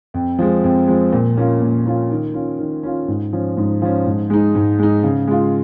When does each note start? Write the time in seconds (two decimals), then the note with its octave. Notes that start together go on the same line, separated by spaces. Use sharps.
0.14 F2
0.39 F3 G#3
0.64 F2
0.88 F3 G#3
1.12 A#2
1.37 A#3 C#4 F4
1.62 A#2
1.85 A#3 C#4 F4
2.11 D#3
2.34 C#4 F4
2.59 D#3
2.83 C#4 F4
3.08 G#2
3.33 F3 C#4
3.57 G#2
3.82 F3 C#4
4.06 G#2
4.30 G#3 D#4
4.55 G#2
4.79 G#3 D#4
5.03 C#3
5.27 G#3 F4